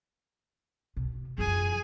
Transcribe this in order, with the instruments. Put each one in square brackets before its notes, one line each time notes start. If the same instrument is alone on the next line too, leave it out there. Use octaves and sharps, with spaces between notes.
[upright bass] B2
[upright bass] F#2 F3 [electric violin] G#4 G#5